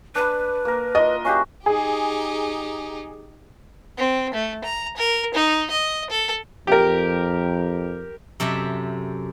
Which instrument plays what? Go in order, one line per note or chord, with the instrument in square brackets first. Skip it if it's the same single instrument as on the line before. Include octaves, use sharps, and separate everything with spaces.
[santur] D4 B5 [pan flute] B4
[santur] A#3 A#4
[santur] F4 A#4 E5 [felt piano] D#5
[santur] C#4 F#4 G4 [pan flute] F5
[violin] D#4 G4 [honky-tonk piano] G#4
[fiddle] C4
A3
A#5
A#4
D#4
D#5
A4
[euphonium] F2 [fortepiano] G4 A#4
[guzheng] F#2 C3 A4 E5